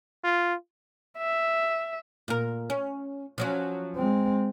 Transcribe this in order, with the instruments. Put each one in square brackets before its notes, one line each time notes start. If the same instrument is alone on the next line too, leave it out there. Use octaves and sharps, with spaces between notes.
[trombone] F4
[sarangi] E5
[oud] A#2 A#4
C#4
F3 F#3 C#4
[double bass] G#3 C4